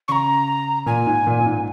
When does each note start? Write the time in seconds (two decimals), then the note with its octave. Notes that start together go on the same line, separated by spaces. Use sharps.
0.08 C#3 A#5 C#6
0.86 A#2 G#5
1.07 G#2
1.27 A#2
1.40 A#2
1.46 G#2